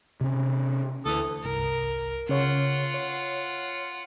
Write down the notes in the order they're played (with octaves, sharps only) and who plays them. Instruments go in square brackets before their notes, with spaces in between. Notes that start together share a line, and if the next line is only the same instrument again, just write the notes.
[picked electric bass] C3 C#4
[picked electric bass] D2 [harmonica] E3 A4 D#6
[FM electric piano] G1 C2 [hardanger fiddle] A#4
[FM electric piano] C#3 C#5 C#6 [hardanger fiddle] F4 F#5
[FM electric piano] C#5